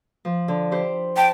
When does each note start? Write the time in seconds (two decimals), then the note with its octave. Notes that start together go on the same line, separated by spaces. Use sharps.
0.25 F3
0.48 D3
0.71 E4 G4 C5
1.17 G5 A5